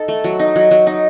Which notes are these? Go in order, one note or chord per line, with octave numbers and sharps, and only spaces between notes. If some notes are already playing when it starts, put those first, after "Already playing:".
Already playing: D#4 A4
A3
F#3
D#4
F#3
F#3
D#4